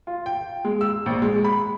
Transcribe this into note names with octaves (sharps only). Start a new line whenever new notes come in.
F4
G5
G#3
E6
A#1
G#3
B5